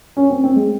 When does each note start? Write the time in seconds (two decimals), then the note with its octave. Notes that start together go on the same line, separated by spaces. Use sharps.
0.17 C#4
0.30 C4
0.44 C4
0.56 G#3